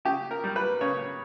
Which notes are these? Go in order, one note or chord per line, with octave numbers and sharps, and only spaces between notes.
C#3 G4
A#4
G3
B4
C#3 C#5